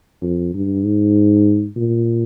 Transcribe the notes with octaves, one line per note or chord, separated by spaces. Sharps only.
F2
G2
G#2
A#2